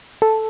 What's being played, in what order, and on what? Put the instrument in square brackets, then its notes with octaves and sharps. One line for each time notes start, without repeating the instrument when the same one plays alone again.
[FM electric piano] A4